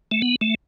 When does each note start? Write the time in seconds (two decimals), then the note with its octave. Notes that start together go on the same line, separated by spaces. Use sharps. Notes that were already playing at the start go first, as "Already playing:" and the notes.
0.11 A3
0.22 B3
0.41 A3